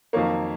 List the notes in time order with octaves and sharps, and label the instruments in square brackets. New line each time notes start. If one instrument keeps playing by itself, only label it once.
[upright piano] F2 D#3 F#3 A#3 A#4 C#5